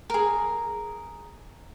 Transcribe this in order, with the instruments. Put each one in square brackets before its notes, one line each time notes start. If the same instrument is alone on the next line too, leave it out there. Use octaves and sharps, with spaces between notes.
[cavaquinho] G#4 A#4